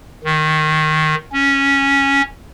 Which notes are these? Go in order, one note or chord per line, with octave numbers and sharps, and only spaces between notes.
D#3
C#4